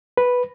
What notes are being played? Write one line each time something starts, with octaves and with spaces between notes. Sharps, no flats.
B4